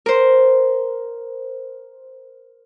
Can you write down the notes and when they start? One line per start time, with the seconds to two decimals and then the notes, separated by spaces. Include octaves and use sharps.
0.06 A#4 C5